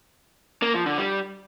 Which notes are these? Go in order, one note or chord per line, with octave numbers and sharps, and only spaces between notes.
A#3
F3
D3
G3